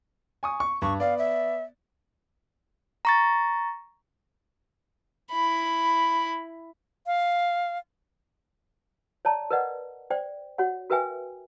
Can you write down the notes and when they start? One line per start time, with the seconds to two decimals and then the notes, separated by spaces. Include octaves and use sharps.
0.43 G#5 C#6 D#6
0.60 C#6
0.82 G2 C#6
1.00 B3 D5 F5
1.18 E5
3.05 A#5 C#6 A6
5.32 E4 B5
7.06 F5
9.25 C#5 D5 A5 A#5
9.51 A#4 B4 D5 D#5 F#5
10.10 C5 D5 G5
10.58 F#4 C#5 F#5
10.90 F#4 A#4 B4 E5 G5 G#5